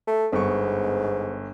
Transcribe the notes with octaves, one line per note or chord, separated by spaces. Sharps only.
A3
G1 G#2 B3 C#6